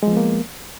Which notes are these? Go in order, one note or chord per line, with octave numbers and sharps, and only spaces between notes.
F3 G#3 A#3 B3